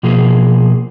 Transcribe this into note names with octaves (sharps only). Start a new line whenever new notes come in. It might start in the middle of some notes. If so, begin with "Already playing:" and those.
B2 F3 A#3 G#4